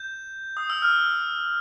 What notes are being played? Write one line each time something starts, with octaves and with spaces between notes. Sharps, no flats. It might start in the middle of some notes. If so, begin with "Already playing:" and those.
Already playing: G6
D#6
E6
F6